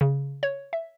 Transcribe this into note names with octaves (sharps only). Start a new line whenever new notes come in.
C#3
C#5
E5